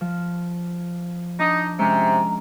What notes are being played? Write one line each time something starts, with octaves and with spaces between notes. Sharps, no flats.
F3
D4 D#4
C3 G#3 C#4 A#5